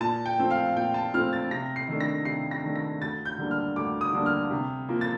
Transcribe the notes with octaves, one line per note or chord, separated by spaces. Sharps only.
A#2 A5
G5
F3 A3 C4
F5
A#2 G5
A5
F3 A3 C4 F6
A6
C3 A#6
C7
D#3 A3 D4
A#6
C3 C7
A#6
D#3 A3 D4
A#6
D2 A6
G6
D3 G3 A#3 D4
F6
D2 D6
D#6
D3 G3 A#3 D4
F6
C3
F3 A#3
A6